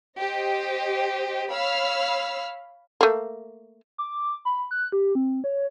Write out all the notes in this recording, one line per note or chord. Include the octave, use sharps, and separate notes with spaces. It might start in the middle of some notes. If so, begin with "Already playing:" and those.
G4 C5 D#5
C#5 F5 B5 E6 F6
A3 A#3
D6
B5
F#6
G4
C4
C#5